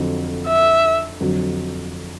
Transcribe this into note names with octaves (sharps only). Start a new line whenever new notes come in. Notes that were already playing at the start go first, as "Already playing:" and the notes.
Already playing: F2 D3 F#3
E5
F2 D3 F#3